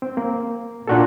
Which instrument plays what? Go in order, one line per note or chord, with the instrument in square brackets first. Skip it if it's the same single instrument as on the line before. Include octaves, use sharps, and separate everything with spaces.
[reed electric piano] C4
A#3
[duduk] A#2 [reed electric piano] D4 F#4 A4